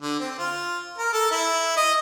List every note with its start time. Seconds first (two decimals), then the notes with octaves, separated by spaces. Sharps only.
0.02 D3
0.20 C4
0.38 F4
0.98 A#4
1.13 A4
1.31 E4
1.77 D#5